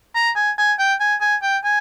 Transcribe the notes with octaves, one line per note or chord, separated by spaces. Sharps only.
A#5
G#5
G#5
G5
G#5
G#5
G5
G#5